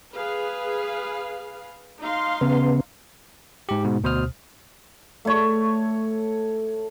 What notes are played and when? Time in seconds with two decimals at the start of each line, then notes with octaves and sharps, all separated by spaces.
0.16 G#4 B4 F5
2.01 D#4 F5 C6
2.41 C#3 B3
3.69 G#2 G4
3.84 G#2 B2
4.04 D2 B2 C5 D#6 F6
5.25 A3 C#5